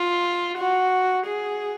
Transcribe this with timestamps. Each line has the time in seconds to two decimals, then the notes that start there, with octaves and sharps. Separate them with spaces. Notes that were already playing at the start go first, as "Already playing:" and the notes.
Already playing: F4
0.58 F#4
1.26 G#4